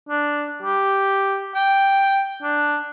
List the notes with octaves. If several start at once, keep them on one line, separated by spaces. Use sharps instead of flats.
D4
G4
G5
D4